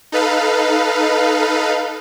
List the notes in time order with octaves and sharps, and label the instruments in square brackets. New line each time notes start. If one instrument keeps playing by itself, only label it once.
[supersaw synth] D#4 A4 B4 F5